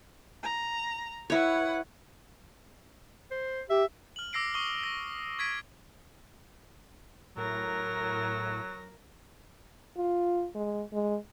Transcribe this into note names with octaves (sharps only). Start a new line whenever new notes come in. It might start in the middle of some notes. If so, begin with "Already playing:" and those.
A#5
E4 B4 C#5 F#5
C5
G4 E5
F6 F#7
D6 E6 A#6 C7 D7
C#6 D#6 G7
A#6
C#6 G#6 B6 D7
A2 F#3 A#4 A#6
F4
G#3
G#3